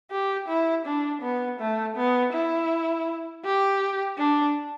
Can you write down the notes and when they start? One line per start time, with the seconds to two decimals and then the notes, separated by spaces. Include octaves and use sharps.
0.11 G4
0.48 E4
0.86 D4
1.22 B3
1.60 A3
1.97 B3
2.34 E4
3.45 G4
4.18 D4